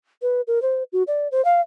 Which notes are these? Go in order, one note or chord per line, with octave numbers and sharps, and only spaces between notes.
B4
A#4
C5
F#4
D5
C5
F5